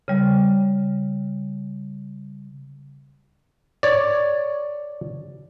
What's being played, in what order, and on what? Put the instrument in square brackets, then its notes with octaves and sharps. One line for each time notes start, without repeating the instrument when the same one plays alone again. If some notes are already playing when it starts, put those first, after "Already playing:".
[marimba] C#3 G3
[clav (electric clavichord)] C#5 D5